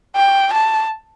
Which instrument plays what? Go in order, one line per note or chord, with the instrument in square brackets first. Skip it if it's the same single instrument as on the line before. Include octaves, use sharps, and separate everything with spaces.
[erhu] G5
A5